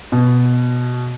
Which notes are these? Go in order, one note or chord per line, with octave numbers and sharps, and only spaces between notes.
B2